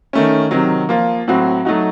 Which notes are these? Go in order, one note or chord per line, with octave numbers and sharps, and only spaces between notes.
D#3 A3 C#4
C3 D#3 F#3
F3 A#3 F4
A2 F#3 C4 F#4
F#3 A3 D#4 F#4